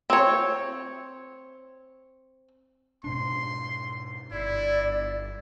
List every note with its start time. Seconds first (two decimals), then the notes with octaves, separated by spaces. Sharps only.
0.10 C4 C#5
3.04 G#2 B2 D4 C6
4.32 G1 E4 D5